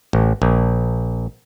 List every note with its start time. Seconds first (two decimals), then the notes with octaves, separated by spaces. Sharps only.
0.13 A1
0.42 A#1